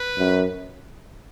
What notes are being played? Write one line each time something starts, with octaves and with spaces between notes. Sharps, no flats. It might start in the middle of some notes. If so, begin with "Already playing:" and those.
Already playing: B4
F#2